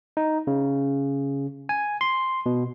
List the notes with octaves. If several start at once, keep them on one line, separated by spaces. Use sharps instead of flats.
D#4
C#3
G#5
C6
B2